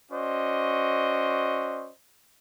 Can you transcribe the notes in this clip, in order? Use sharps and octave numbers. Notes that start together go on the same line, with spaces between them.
C#4 F#4 C5 D5 D#5